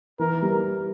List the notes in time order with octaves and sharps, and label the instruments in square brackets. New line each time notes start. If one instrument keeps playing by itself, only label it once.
[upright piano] E3 [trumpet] A#4
[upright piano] G3